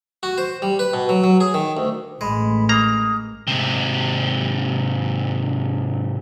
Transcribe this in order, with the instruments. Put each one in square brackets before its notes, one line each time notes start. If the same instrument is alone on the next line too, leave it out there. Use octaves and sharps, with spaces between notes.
[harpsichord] F#4
C5
G3
B4
B2
F#3
F#3
G#4
D#3
D2
[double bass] A1 [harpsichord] G#3 [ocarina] B5
[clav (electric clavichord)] A#3 A#5 [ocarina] D#6
[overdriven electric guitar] G#2 C3